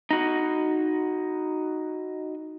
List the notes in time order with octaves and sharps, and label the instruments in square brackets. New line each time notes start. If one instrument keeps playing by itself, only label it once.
[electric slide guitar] D#4 F#4